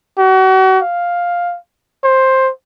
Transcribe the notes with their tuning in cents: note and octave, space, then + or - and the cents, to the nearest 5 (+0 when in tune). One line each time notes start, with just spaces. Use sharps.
F#4 +35
F5 +5
C5 +10